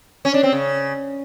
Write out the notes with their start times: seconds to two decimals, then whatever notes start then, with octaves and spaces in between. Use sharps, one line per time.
0.25 C#4
0.34 D4
0.43 C4
0.52 C#3